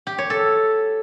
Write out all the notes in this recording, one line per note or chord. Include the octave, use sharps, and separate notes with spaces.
G4
C#5
A4